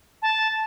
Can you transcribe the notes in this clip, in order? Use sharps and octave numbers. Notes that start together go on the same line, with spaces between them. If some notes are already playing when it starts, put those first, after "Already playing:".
A5